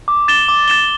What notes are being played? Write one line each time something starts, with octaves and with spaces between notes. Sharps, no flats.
D6
A6 E7 G7
D6
A6 E7 G7